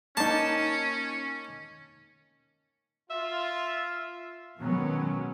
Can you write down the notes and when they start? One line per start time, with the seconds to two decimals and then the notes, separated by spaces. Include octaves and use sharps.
0.17 A#3 C#4 D#4 A5
3.10 F4 E5
4.59 B2 D#3 F#3 G#3 B3 C#4